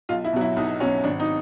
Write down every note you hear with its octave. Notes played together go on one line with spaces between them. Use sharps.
B1 F4
E4
B2 F#3
E4
B1 D#4
B2 F#3 C#4
G#1 D4
D#4